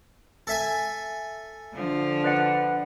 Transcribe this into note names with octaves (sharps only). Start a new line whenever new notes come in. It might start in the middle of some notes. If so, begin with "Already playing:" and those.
A4 E5 G#5
D3 F3
B4 D5 F#5